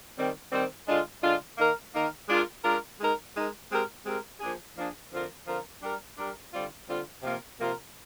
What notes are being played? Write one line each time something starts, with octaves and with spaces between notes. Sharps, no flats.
D#3 G3 C4
D#3 G3 C4
D3 G#3 D4 F4
D3 G#3 D4 F4
D#3 A#3 D#4 A#4
D#3 A#3 D#4 A#4
G#3 D4 F4 A#4
G#3 D4 F4 A#4
G#3 D#4 A#4
G#3 D#4 A#4
G#3 C4 G4 A#4
G#3 C4 G4 A#4
F3 A#3 D4 G#4
F3 A#3 D4 G#4
D3 F3 C4 F4 A#4
D3 F3 C4 F4 A#4
G3 D4 G4 A#4
G3 D4 G4 A#4
D3 G3 C4 F4
D3 G3 C4 F4
C3 F3 A#3 F4 A#4
C3 F3 A#3 F4 A#4